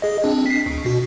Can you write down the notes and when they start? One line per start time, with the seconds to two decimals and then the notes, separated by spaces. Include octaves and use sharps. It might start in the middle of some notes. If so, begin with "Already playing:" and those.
0.02 G#4 D#5
0.24 C4 D4
0.46 B6 C7
0.66 D2
0.85 B2 F#4